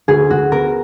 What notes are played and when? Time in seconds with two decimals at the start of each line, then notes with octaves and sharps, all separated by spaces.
0.08 D2 G#4
0.30 D2 F#4
0.52 B3 A#4